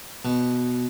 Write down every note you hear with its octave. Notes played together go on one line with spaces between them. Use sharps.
B2